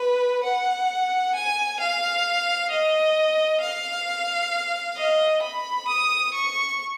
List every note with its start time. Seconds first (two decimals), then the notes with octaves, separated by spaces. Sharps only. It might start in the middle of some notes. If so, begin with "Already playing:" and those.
Already playing: B4
0.44 F#5
1.35 G#5
1.80 F5
2.71 D#5
3.61 F5
4.97 D#5
5.42 B5
5.88 D#6
6.34 C#6